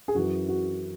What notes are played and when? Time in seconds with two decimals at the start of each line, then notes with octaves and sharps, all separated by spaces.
0.08 G#4
0.15 F#2 E3 F#4
0.49 F#4